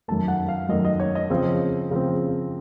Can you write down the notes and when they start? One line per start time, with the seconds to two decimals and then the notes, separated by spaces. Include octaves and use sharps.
0.08 F#2 D#3 A3 A5
0.28 F#5
0.48 F5
0.69 F#2 D#3 A3 D#5
0.85 D#5
1.00 C#5
1.15 D#5
1.30 C#3 F3 C4
1.91 C#3 F3 C4